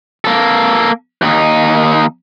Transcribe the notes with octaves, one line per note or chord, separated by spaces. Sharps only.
A#3 A4
D#2 D#4